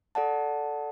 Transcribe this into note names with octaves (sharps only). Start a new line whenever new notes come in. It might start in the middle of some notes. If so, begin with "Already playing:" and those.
A4 D5 F#5 A5